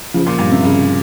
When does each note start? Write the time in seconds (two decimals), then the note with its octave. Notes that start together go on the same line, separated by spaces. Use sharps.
0.14 C#3 F3
0.26 A#2
0.38 G2 A#2
0.51 C3
0.63 G2 C#3